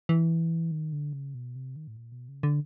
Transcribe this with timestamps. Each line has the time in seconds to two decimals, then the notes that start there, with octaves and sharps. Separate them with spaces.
0.09 E3
0.71 D#3
0.93 D3
1.13 C#3
1.34 B2
1.56 C3
1.76 D#3
1.88 A2
1.97 A#2
2.12 B2
2.28 C#3
2.43 D3